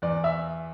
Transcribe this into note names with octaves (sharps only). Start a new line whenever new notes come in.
E2 D5
E5